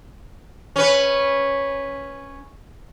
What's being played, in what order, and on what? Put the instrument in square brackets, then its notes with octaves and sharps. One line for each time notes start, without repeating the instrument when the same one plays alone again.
[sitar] C#4 B4